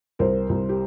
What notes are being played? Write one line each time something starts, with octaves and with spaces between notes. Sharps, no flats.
C2 A#4 C5
C2
G4